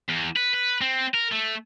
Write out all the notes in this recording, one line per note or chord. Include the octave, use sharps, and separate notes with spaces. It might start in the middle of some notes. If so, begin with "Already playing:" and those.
E2
B4
B4
C4
A#4
A3